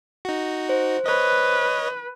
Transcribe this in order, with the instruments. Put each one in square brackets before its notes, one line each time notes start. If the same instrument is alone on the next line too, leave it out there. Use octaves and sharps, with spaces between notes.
[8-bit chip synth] D#4 F#4
[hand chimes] C5
[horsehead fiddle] B4 [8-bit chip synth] C#5 D#5